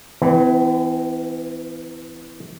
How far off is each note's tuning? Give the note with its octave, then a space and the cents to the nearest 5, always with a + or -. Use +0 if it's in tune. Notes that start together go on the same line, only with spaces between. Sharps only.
E3 +0 C4 -45